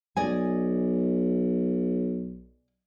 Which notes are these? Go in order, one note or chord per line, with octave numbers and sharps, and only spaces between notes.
B1 D5 D#5 G#5